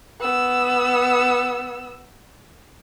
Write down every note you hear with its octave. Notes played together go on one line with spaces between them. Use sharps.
B3 E6